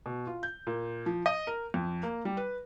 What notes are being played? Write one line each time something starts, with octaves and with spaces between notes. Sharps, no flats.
B2
F4
G6
A#2
F3
D#5
A#4
F2
A#3
G3
B4